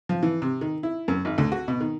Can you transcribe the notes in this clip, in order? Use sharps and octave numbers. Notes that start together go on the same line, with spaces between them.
F3
E3
C3
D#3
E4
F#2
G#1
D2
F#4
B2
D#3